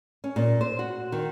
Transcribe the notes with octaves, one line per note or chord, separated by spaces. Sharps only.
C#4
A#2
C5
F#4
D#3